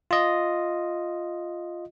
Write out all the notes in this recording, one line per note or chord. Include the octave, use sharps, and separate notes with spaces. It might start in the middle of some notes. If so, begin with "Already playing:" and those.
F4 D#5